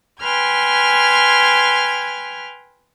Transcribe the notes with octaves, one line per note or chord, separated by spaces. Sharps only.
B4 G5 G#5 C6 F6 G#6